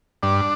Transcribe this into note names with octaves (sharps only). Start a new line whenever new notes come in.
G2 D4